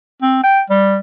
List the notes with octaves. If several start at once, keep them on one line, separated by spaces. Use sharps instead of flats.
C4
G5
G3